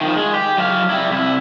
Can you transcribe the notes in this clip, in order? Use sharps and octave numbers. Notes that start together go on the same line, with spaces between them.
D#3 F3
G#3
G4
F#3 F5
G3 E4
C2 E4